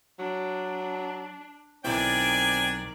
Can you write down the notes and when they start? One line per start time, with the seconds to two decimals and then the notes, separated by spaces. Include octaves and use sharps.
0.19 F#3 D4
1.85 B1 D#3 C4 D4 E4 D5 G#5